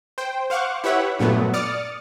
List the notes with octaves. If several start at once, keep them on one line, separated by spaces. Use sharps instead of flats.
C5 G5
C5 F5 F#5 C#6 D6
E4 G4 B4 C#5 E5 F#5
G2 A#2 F#3 A3 B3
D5 D6 D#6 F6 A6 C#7